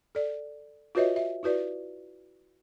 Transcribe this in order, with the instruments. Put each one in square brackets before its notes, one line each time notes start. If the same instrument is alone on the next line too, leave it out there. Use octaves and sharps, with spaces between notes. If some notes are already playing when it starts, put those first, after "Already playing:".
[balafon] A4 D5
F4 F#4 B4 C#5 D#5 E5
E5
E4 F#4 B4 D5